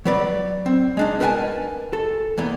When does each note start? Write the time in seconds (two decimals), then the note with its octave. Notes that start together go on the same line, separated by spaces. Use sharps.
0.05 F#3 B4 D5
0.66 C4
0.97 G#3 D4 D#4
1.20 A#4 B4 E5 F#5 G#5 A5
1.93 A4
2.38 E2 A#3 B3